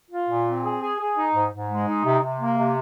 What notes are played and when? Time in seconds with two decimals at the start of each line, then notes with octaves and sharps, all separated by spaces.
0.11 F4
0.29 A#2
0.46 C4
0.64 G#4
0.82 G#4
0.99 G#4
1.17 D#4
1.35 G#2
1.51 G#2
1.70 G#3
1.87 D#4
2.04 C3
2.22 C3
2.40 A#3
2.57 C3